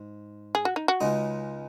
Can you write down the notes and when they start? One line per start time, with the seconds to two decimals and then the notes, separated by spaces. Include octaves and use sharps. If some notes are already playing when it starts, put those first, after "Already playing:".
Already playing: G#2
0.55 G#4
0.65 F#4
0.76 D#4
0.88 F#4
1.01 C#2 C#3 G#3 D#4